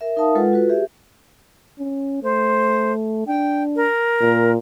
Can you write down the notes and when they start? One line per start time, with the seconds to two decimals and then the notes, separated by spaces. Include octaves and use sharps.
0.01 A#4 E5
0.17 D#4 A#4 E5 F5 A5 D#6
0.35 G#3 F4 A4 B4 F#5
0.53 F4 F#4 A4 B4
0.69 G4 G#4 E5
1.79 C#4
2.23 A3 C5
3.27 D4 G5
3.76 A#4
4.21 A#2